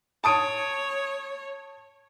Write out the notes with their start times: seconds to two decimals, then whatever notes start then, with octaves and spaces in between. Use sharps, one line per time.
0.24 C#5 A5 D#6 D7